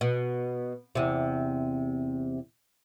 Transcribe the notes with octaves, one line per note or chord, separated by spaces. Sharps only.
B2
E2 C3